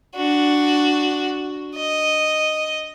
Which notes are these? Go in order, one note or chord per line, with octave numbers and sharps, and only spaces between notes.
D4 F#4
D#5